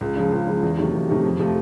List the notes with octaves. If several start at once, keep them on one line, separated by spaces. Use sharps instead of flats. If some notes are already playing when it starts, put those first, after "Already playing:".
C#2
C#3 F3
C#2
C#3 F3
E2
C3 D#3 F#3 A3
E2
C3 D#3 F#3 A3
F2
C3 F3 A3